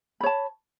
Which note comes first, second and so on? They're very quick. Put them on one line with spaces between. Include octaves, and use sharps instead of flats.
B5 C#5 A5